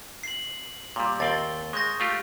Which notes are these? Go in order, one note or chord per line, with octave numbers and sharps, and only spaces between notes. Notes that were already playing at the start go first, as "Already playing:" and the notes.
C7 F#7
A#2 G3
D#2 C4 D5 A6 G7
G#3 C#6 G6 A#6
A3 F4 G4